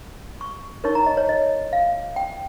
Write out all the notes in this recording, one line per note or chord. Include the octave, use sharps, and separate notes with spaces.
C#6
D#4 A#4 C#5 C#6
A#5
D#5
C#5
D#5
F5
G5